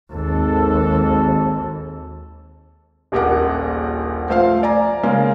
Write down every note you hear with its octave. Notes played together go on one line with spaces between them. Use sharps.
G#1 D#2 A4
D#1 A#1 G4 A#4 F#5
F3 A3 C5 F5
D5 G#5 A#5
C#3 G#3 A#3 C#4